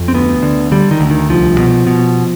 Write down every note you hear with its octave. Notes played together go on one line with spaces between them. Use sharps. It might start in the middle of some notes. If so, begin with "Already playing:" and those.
Already playing: F2
C4
D2 B3
D3
D3 G3
D#3
D2
D#3
C2 F3
B2
B2